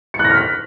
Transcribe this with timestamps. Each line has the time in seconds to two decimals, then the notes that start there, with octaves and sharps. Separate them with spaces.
0.14 C#7
0.19 F#6
0.25 A#6
0.30 F6
0.35 B6